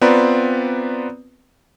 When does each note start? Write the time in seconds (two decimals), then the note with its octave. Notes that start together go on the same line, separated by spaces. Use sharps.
0.01 B3 C4 F4 B4 D5 A#5